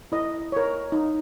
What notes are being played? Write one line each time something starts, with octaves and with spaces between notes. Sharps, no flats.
E4 D#5
A#4 C#5
D#4